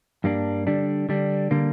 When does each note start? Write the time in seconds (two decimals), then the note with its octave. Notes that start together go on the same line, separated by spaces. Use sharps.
0.24 G2 G3 A#3 D4
0.67 D3 G3 D4
1.09 D3 G3 D4
1.51 D3 G3 A#3